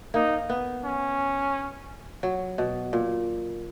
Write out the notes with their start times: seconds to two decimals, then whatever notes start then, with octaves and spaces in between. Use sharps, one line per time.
0.14 A#3 D#4
0.50 B3
0.84 C#4
2.23 F#3
2.58 B2
2.93 A#2